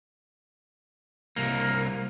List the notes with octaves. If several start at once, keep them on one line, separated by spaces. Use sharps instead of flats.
C2 A#3